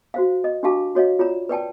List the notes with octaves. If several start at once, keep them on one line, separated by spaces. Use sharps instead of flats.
F#4 C5 F5
D#5
D4 F#4 G4 F5 A5 D6
F#4 C#5 D#5 F5
F4 C#5 D5 A#5
B4 D5 G5 A5